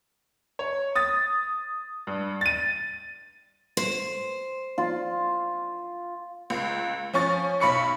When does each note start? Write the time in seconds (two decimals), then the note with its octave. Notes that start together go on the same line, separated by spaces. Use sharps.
0.59 C#5
0.96 D#6 A6
2.07 G2
2.41 A6 D#7
3.77 C5
4.78 F4
6.50 C#2
7.13 F3 C#4 C#6 A6
7.60 B1 B5 C#6 C#7